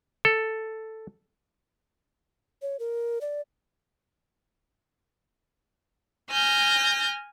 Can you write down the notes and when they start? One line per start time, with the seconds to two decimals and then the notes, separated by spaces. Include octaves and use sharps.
0.25 A4
2.62 C#5
2.79 A#4
3.21 D5
6.31 G#5 F6 G6 A#6